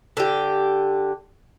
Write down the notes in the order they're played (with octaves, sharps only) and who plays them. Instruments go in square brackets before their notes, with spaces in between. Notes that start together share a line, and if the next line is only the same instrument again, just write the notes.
[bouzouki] D3 G4